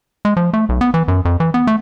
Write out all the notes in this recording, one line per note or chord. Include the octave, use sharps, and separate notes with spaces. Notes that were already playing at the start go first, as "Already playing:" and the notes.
G#3
F3
A3
B1
B3
E3
F#2
F2
E3
B3
A3